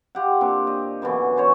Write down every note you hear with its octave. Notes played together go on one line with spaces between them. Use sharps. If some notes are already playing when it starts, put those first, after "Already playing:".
F4 G4 F#5
A#2 C4 D4 G4
D#5
F#2 B2 D3 E3
C#4 C5 C#5